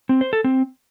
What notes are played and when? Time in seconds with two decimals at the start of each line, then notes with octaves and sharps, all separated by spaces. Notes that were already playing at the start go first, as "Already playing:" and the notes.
0.09 C4
0.21 C5
0.33 A4
0.44 C4